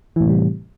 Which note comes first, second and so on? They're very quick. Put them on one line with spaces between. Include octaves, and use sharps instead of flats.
E3 A2 C3 G3